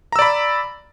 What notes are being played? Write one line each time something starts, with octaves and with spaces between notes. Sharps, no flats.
D5 A#5 B5 E6